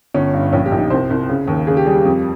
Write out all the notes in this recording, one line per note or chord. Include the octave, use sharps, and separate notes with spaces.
G1 C#4
G2
A#1 C#4
G4
A#1
D#4
C2 C5
C2
C#3
D#2
C#3 G#4
G4
G3 G#4
G4
F2